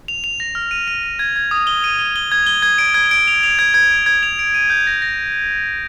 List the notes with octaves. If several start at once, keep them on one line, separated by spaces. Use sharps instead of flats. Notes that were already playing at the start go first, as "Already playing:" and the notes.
F7
F7
A#6
F6
D#7
D#7
D#7
G#6
G#6
D#6
G7
D#7
G7
G7
G#6
G7
G#6
D7
G#6
D7
F7
F7
G#6
G#6
D7
G#6
F7
D7
D#7
G6
A#6
A#6